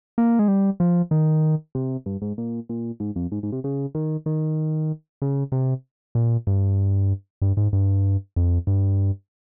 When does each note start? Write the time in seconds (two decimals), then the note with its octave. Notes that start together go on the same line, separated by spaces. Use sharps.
0.18 A#3
0.39 G#3
0.48 G3
0.80 F3
1.11 D#3
1.75 C3
2.06 G2
2.22 G#2
2.38 A#2
2.69 A#2
3.00 G#2
3.16 F2
3.32 G#2
3.43 G#2
3.52 C3
3.64 C#3
3.95 D#3
4.26 D#3
5.22 C#3
5.52 C3
6.15 A#2
6.47 G2
7.42 G2
7.57 G#2
7.73 G2
8.36 F2
8.67 G2